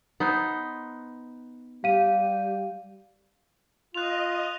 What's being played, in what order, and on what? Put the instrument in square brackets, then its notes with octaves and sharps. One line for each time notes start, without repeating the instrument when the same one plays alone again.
[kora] B3 D#4 C5
[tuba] G3 [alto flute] G4 [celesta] F5 D#7
[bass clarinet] F4 [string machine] D#5 [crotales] F#6 F7